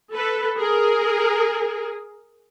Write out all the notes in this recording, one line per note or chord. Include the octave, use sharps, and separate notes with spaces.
A4 B4
G#4 A#4